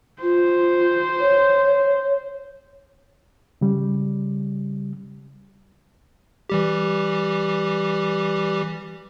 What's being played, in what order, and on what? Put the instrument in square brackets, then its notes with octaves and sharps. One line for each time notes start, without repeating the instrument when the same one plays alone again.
[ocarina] F4 [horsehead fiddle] C5
[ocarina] C#5
[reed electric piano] C#3 G3
[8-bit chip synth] E3 G3 G4